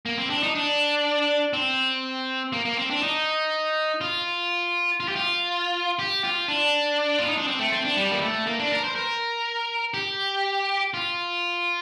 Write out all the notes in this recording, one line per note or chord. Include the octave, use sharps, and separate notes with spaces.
A#3
C4
D4
D#4
D4
C4
A#3
A#3
C4
D4
D#4
F4
F4
G4
F4
G4
F4
D4
F4
D#4
D4
C4
A3
C4
D4
G3
A#3
A3
A#3
D4
A#4
C5
A#4
G4
F4